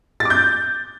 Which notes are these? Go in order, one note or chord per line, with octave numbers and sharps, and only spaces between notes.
A6
D6
G6